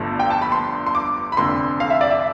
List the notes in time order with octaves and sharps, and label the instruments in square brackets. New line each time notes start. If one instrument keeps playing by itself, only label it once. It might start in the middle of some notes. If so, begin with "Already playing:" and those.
Already playing: [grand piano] G1 G2 D3 F3 A3
G5
A5
B5
C6
C6
D6
B5
F1 F2 D3 C6
F5
E5
D5
E5